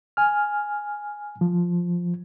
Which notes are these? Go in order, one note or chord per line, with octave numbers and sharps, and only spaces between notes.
G#5 F6
F3